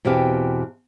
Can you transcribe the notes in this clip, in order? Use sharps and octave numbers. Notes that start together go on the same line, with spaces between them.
E2 B2 C4 G4 F5